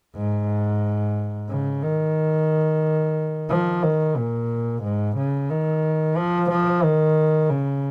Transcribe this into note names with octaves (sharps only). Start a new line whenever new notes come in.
G#2
C#3
D#3
F3
D#3
A#2
G#2
C#3
D#3
F3
F3
D#3
C#3